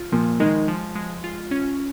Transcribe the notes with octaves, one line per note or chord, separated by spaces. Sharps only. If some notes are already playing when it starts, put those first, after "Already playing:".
Already playing: F4
A#2 F3
D#3 G#3
F3
G#3
F4
C#4